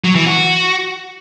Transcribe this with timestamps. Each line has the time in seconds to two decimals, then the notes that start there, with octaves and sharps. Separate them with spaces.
0.04 F#3
0.15 E3
0.26 F#4